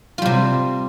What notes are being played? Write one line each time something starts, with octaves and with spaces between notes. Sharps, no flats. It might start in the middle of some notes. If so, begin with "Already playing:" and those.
C3 G3 F4